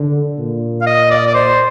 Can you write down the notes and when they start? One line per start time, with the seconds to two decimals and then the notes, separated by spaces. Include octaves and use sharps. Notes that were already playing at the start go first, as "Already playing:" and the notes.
Already playing: D3
0.38 A#2
0.82 F5
0.87 D#5
1.11 D5
1.27 D5
1.35 C5